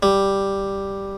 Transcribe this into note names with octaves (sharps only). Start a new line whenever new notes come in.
G3